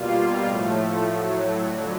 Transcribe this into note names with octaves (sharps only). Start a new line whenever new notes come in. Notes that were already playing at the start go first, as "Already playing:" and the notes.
Already playing: B2 G3 A#3 F4
A2 F3 A3
A2 F#3 A3
F2 D3 F#3 F#4